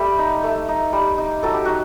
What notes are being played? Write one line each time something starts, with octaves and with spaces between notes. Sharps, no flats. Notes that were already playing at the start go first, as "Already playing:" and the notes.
Already playing: G3 A3 G4
D#4
A3
D#4
G3
D#4
F#3 A4
G4
D#4 F#4